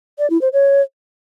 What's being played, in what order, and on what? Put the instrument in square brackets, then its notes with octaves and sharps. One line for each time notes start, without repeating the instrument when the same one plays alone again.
[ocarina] D5
E4
C5
C#5